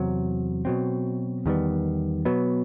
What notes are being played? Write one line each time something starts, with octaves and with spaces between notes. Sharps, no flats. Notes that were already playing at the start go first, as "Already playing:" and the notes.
Already playing: E2 C3 F#3
B2 F#3 C4
E2 D#3 G3 B3
B2 F#3 B3